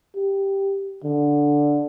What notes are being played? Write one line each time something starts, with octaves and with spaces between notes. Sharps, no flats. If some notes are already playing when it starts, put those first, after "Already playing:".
G4
D3